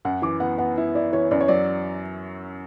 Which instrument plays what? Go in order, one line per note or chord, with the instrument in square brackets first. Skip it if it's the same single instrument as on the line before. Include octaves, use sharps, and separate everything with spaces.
[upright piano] F#2 [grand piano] F#5
[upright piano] E3 [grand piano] D6
[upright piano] B3 [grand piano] F#5
[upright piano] B3 [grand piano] F#5
[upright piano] E4
[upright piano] E4 [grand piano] D5
[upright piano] E3 [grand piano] C#5
[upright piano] F#2 [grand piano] D5
[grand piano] C#5
[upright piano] F#3 [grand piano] D5